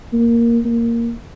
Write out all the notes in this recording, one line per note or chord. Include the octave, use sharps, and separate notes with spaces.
A#3
A#3